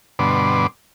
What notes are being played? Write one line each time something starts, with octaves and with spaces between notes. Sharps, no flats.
G2 B2 D3 B4 C6 D6